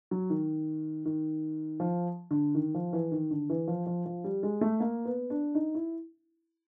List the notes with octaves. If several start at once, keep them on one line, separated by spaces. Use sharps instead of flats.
F#3
D#3
D#3
F3
D3
D#3
F3
E3
D#3
D3
E3
F3
F3
F3
G3
G#3
A3
A#3
B3
D4
D#4
E4